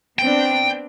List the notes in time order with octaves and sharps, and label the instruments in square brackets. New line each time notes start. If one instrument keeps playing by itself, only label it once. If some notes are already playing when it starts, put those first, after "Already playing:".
[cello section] B3 C4 D4 [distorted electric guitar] G5